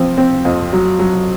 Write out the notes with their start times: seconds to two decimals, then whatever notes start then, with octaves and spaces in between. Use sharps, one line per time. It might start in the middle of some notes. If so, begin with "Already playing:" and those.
Already playing: F3 C4
0.18 C4
0.45 F2
0.73 F#3
0.99 F#3